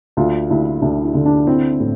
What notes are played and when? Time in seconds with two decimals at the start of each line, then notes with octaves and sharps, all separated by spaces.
0.17 D2 F4
0.50 D2 E4
0.82 D2 D4
1.04 E4
1.14 D3
1.26 D4
1.47 C4 E4
1.80 A2